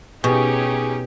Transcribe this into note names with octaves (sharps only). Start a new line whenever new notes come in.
B2 C#4 D#4 G4 G#4